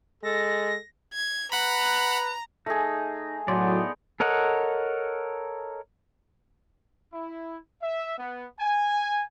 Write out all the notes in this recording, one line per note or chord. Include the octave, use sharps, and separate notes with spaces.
G#3 A4 A#6
G#6
B4 F#5 A#5 B5
A3 D#4 G#4
A2 F#3 B3 D#4 D5 C6
A4 A#4 C#5 D#5 F#5
E4
E5
B3
G#5